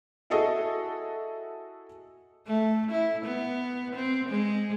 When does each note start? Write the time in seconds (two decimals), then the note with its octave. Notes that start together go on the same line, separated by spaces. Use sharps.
0.30 E4 F#4 G#4 A4 D#5
2.47 A3
2.91 E4
3.25 B3
3.95 C4
4.29 G#3